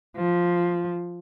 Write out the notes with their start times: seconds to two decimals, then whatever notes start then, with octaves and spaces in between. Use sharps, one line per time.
0.17 F3